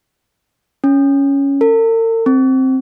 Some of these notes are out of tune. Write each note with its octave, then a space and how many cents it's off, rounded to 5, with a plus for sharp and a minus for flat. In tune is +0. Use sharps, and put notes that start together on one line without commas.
C#4 +5
A#4 -45
C4 +5